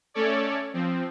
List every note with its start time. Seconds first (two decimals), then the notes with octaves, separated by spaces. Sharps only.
0.14 A3 C#4 A4 C#5 D5
0.73 F3 C4